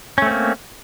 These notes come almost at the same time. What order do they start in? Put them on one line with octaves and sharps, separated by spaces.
C#4 A3 C4 A#3